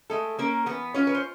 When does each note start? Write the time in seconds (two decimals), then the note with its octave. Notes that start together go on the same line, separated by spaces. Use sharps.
0.10 G#3 A3 A4
0.39 A#3 C#4 A#4
0.66 E3 B3 B4
0.94 C#4 F4 C#5
1.07 B4
1.15 C5